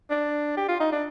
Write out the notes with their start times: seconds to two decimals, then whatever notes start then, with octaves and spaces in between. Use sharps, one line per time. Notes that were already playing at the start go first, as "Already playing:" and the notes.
0.10 D4
0.57 G4
0.68 F4
0.80 D#4
0.92 D4